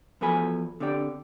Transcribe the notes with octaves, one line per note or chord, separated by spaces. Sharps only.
E2 F3 F#4 A4 G#5 B5
D3 C4 G4 D5 G5